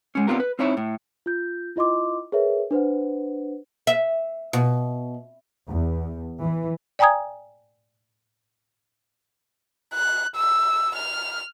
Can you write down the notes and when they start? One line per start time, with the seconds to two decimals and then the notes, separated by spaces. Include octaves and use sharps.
0.15 G#3 C#4
0.27 B3 C4 D4 F4 G4 A#4
0.40 B4
0.59 C4 D#4 E4 C#5 E5
0.77 A2
1.26 F4 G6
1.76 E4 F4 D#5 C6 D6
2.32 G#4 A#4 B4 C#5 E5
2.71 D4 B4 C5 F#5
3.87 E5
4.53 B2
5.67 E2
6.40 E3
6.99 D5 G5 G#5 A#5 D#6 G#6
9.94 F#6
10.36 E6
10.96 F6